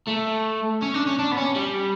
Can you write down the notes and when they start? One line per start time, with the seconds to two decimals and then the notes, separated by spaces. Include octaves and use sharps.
0.08 A3
0.82 C#4
0.94 D4
1.07 C#4
1.19 D4
1.32 B3
1.37 C#4
1.56 G3